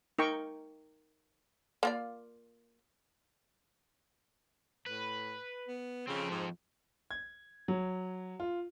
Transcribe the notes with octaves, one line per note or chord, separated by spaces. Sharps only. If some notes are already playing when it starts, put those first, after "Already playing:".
D#4 A#4 G5 C#6
A#3 F4 D5
A2 B4
B3
F2 C#3 C4
G#2
G#6
F#3
F4